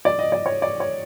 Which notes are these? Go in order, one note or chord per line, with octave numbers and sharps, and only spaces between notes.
D5
D#5
D5
C#5
D5
C#5